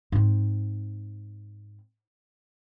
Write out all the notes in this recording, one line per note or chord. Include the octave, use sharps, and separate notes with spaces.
G#2 C4